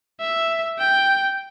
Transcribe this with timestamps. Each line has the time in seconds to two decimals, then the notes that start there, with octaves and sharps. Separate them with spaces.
0.21 E5
0.79 G5